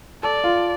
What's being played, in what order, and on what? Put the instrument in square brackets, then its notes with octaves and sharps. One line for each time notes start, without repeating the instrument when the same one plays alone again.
[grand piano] A4 [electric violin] D5
[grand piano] F4